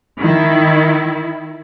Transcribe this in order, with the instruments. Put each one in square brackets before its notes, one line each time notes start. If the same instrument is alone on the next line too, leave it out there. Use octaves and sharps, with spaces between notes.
[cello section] D#3 E4